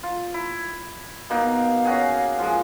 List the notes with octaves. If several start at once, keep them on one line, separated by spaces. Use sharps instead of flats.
F4
E4
B2 A#3 D#4 F5
C#4 F#4 G#4
F3 G#3